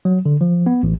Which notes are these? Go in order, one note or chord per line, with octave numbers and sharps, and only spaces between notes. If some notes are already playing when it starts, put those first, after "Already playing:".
F#3
D3
F3
B3
A1